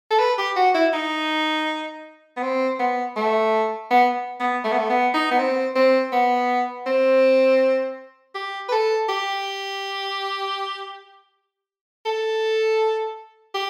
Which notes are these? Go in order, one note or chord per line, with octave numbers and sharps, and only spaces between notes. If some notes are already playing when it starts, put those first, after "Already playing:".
A4
B4
G4
F#4
E4
D#4
B3
C4
B3
A3
B3
B3
A3
B3
A3
B3
D#4
B3
C4
C4
B3
C4
G4
B4
A4
G4
A4
G4